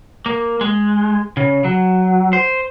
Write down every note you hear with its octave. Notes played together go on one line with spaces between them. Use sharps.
A#3
G#3
C#3
F#3
C5